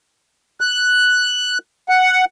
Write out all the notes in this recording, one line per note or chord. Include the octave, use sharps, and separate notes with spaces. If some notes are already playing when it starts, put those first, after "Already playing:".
F#6
F#5